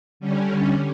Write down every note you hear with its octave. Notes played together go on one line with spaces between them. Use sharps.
D3 G3 C#4